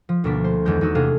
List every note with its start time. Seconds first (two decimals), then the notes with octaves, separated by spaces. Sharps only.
0.09 F3
0.24 D2 B2 A#3 D4 B6
0.44 C5
0.65 E2 D#3 G#3 G6
0.81 E2 D#4 F#4 E6
0.95 C3 A3 D4 G#4 A4 F5